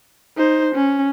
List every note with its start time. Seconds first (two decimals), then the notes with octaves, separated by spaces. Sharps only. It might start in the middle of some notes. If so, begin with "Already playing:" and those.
0.37 D#4 C5
0.75 C#4